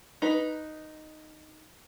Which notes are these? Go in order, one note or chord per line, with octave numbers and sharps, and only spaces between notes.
D#4 B4